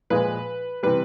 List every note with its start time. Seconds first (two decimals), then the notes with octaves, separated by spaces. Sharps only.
0.10 A#2 F3 G#3 B4
0.83 C3 E3 G3 B4